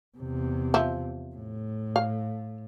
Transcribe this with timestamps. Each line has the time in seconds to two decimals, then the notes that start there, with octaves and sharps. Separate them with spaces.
0.18 E2 C3
0.74 F3 E5
1.36 A2
1.96 F5